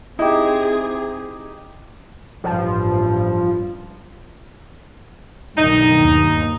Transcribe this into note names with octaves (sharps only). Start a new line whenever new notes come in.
C4 D#4 E4 G4 G#4
A1 G2 F3
B1 G2 D#3 D#4
D#2